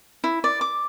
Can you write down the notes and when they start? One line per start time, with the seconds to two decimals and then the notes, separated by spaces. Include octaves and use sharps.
0.24 E4
0.44 D5
0.61 D6